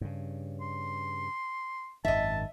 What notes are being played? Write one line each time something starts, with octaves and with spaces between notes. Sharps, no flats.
G2 C#3
C6
G#1 F#2 D#3 D#5 E5 A5